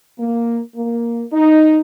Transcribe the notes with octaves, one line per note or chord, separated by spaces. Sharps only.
A#3
A#3
D#4